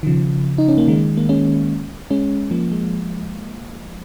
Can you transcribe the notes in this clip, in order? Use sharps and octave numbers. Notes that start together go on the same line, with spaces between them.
D#3
C#3 F3
D#4
C#4
A#3
D#3 G#3
A#3
G#3 C#4
G#3 C#4
F3 A#3
G#3